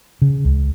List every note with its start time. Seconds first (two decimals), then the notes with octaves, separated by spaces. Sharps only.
0.22 C#3
0.45 C#2